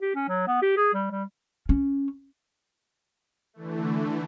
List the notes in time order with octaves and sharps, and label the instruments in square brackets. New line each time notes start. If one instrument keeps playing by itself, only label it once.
[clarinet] G4
C#4
F#3
B3
G4
G#4
G3
G3
[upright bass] C#4
[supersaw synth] D3 E3 A3